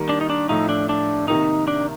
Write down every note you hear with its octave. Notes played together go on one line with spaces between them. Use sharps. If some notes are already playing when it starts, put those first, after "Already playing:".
Already playing: D#3 G3 A#3
D4
D#4
D4
A2 F3 A3 D#4
D4
D4
C3 D#3 A#3 D#4
D4